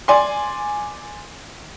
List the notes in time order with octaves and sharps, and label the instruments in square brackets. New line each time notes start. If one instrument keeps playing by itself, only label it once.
[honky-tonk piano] D5 G#5 C6